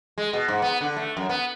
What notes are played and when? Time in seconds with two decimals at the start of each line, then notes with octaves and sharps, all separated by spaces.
0.18 G#3
0.33 B2
0.48 G#2
0.62 B3
0.81 D3
0.96 A3
1.17 F#2
1.29 B3